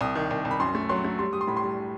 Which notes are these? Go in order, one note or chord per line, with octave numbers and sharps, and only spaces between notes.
C2 D#6
D#3
C2
C2
B5
F#2 C6
A3
F#3 C6
A3
G3 C6
G3 D#6
C6
A2 B5
C6
G3